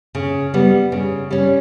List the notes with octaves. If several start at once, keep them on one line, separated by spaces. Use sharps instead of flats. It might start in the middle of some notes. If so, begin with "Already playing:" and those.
C#3
G3 B3
C#3
G3 C#4